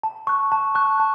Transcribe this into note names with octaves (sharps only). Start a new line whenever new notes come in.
A5
C#6 F#6
A5
C#6 F#6
A5